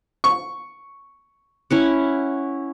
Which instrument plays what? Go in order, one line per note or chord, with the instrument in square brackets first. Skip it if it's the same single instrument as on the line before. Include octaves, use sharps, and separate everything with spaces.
[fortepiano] C#6
[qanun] C#4 E4 F#5